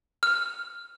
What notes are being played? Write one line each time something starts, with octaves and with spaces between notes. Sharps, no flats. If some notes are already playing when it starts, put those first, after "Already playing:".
F6